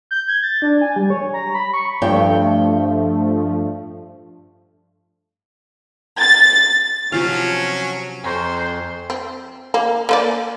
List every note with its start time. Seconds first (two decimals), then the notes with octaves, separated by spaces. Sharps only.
0.11 G6
0.28 G#6
0.43 A6
0.62 D4
0.81 G#5
0.96 G3
1.10 C#5
1.34 A#5
1.54 B5
1.73 C#6
2.02 G2 F3 A3 G5
6.19 A6
7.12 C3 F3 F#3 C#4 F5
8.24 F2 C5 G#5 A#5 C#6
9.10 C4
9.74 A#3
10.09 A#3 B4 D5